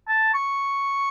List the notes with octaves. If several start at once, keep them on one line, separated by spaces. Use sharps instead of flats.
A5
C#6